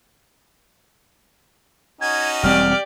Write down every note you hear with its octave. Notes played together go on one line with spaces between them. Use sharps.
C#4 D#4 F#4 G#6
E1 G3 C4 G4 D5 F6